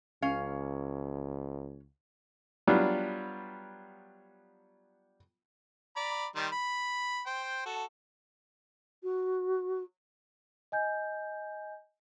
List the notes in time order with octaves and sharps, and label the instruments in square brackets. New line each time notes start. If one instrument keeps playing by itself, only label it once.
[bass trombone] C#2 [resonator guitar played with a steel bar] C#4 F5
[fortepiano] F#3 G3 B3 D4 F4
[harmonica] D5 A#5 B5
D#3 G3 C6
B5
C5 G5
F#4 A4
[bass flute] F#4
[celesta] D#5 G#5 G6